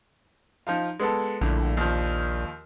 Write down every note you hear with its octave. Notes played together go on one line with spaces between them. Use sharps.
F3 D#4 F4
G#3 B3 A4
A#1 A2 D3
D#2 F3